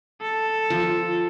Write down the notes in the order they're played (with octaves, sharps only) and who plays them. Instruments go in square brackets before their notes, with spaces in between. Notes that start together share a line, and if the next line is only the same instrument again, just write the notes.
[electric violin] A4
[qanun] F3